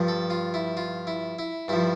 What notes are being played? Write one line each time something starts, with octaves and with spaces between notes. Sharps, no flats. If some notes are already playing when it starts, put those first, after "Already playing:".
Already playing: G2 F3
A4
F4
E4
F4
E4
E4
G2 F3 E4